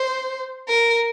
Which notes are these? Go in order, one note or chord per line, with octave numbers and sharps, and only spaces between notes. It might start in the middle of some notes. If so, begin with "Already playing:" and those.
Already playing: C5
A#4